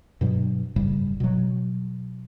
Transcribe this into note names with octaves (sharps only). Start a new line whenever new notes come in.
G2 B2 F#3
F#1 G#2 C#3 G3
B2 F#3